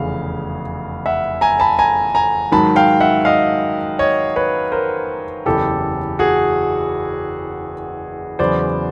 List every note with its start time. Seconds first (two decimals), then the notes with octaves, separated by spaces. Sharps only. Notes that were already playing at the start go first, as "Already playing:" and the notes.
Already playing: F1 E2 C#3 F5
1.06 E5 F#5
1.41 G#5 A#5
1.60 A5 B5
1.79 G#5 A#5
2.15 G#5 A#5
2.51 G#2 D#3 F#3 A5 B5
2.76 F5 G5
3.00 E5 F#5
3.25 D#5 F5
3.99 C#5 D#5
4.36 B4 C#5
4.72 A#4 C5
5.46 F#1 E2 C#3 E3 G4 A4
6.19 F#4 G#4
8.39 E2 C#3 F#3 B3 C5 D5